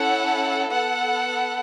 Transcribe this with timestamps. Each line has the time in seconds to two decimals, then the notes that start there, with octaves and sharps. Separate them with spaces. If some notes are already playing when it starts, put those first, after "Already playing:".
Already playing: C#4 E4 A4 F#5
0.72 B3 A4 F#5